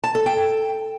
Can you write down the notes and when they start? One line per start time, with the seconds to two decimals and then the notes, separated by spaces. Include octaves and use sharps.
0.04 A5
0.15 A4
0.26 G5